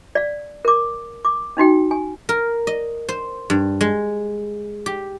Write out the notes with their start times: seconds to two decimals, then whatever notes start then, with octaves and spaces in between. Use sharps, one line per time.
0.15 D5 F5
0.65 A#4 D6
1.25 D6
1.57 C#4 D#4 F#4 G5
1.91 G#5
2.29 A#4
2.67 D#5
3.09 C5
3.50 G2
3.81 G#3
4.86 G4